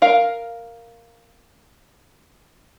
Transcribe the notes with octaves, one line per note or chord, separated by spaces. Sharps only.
A#4 F5